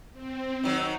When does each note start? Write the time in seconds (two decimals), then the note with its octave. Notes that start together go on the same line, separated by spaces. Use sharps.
0.13 C4
0.64 D#3 F#3 D#4